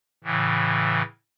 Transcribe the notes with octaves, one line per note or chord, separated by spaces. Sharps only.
A2 C#3 E3